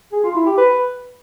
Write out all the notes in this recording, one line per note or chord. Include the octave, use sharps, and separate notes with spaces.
G#4
F4
E4
G4
B4